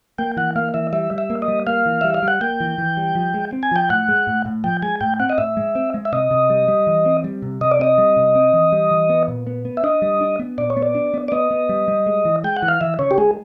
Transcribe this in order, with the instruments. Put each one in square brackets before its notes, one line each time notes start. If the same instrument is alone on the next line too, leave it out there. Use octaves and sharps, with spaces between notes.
[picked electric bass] A#3 [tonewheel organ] G5
[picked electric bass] E3 [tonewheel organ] F#5
[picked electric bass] A#3 [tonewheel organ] F5
[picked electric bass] E3 [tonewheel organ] E5
[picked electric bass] G3 [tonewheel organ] E5
[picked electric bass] G3
[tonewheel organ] E5
[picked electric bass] A#3
[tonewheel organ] D#5
[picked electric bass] G3
[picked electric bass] A#3 [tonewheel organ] F5
[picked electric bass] E3
[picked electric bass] G3 [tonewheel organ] E5
[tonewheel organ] F5
[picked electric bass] G3
[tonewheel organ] F#5
[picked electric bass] A#3 [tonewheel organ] G5
[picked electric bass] E3
E3
G3
F3
G#3
C4
[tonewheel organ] G#5
[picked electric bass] F3 [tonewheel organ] G5
[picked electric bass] A2 [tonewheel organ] F#5
[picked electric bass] G#3
A2
A2
[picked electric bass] F3 [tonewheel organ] G5
[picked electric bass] G#3 [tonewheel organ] G#5
[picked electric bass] A2 [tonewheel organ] G5
[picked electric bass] C4 [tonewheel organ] F#5
[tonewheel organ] D#5
[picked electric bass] A2 [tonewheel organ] E5
[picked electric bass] G#3
C4
G#3
[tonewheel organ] E5
[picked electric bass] C3 [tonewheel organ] D#5
[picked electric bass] C3
G3
G3
E3
C4
G3
C3
[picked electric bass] C3 [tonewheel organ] D#5
[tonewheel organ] D5
[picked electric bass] C4 [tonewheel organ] D#5
[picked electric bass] G3
C3
C4
E3
G3
E3
B3
A#2
B3
B3
[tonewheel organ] E5
[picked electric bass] D4 [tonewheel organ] D#5
[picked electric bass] G3
D4
B3
[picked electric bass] A#2 [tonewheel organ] D5
[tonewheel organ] C#5
[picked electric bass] B3
[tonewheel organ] D5
[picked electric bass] D4
B3
[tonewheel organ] D5
[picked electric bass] B3 [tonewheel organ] D#5
[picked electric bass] B3
G3
G3
G#3
E3
[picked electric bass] G#3 [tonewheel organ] G5
[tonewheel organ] F#5
[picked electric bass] E3
[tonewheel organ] F5
[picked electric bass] E3 [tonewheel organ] E5
[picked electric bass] C#3 [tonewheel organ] C#5
[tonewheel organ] G4
[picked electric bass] G#3 [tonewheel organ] G#4